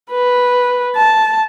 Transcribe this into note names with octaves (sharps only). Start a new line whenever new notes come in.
B4
A5